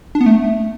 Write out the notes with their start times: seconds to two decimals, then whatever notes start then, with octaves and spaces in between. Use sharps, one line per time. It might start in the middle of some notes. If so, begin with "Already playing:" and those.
0.15 D4
0.21 B3
0.26 A3